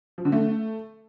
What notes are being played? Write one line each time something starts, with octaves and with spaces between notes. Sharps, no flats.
F3
D3
A3